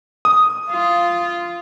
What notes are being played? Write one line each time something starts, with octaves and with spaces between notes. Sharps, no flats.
D#6
F4